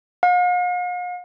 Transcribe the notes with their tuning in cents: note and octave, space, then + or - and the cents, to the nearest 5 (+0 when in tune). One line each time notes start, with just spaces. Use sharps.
F5 +45